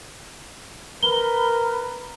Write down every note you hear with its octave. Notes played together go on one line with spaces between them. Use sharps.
A#4 B4 G7